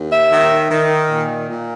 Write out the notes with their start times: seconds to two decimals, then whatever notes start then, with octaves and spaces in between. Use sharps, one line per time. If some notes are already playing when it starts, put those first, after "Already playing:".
Already playing: D#2
0.10 E5
0.31 D#3
0.70 D#3
1.10 A#2
1.50 A#2